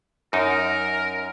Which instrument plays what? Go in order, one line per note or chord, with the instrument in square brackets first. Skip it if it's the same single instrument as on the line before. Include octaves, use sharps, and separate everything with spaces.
[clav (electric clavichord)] F#2 D#4 [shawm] A#4